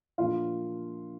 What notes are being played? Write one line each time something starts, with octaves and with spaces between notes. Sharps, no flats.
A#2 F3 A#3 D4 F4